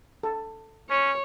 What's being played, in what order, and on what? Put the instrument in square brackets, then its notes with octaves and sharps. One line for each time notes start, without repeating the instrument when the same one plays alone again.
[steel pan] A4
[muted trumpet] C#4 [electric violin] C#5